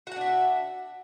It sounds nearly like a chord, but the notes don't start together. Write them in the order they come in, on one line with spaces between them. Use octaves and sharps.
F#4 F#5 D4 E5